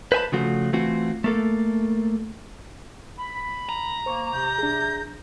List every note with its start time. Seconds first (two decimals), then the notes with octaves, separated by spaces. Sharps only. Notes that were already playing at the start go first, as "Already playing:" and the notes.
0.12 B4 C5 E5 G#5 A5 B5
0.32 C#3 F3 A3 F4 F#4
0.73 E3 A3 C4 F4 F#4
1.24 A3 A#3 A4
3.19 B5
3.69 A#5
4.06 A#3 C5 C#6
4.33 C3 G6
4.58 D4 G#4